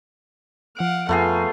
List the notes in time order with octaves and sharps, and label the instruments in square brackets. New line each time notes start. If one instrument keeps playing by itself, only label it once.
[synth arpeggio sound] F3 D7 [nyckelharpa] F5 F#5
[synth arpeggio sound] F2 A#5 [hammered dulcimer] A3 B3 G#4 [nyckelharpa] F4